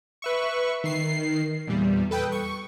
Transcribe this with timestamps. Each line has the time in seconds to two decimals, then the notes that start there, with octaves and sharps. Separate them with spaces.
0.22 B4 E5 C#6
0.84 D#3 C7
1.67 E2 A#2 G3
2.11 A4 B4 G5 D#6
2.32 C#6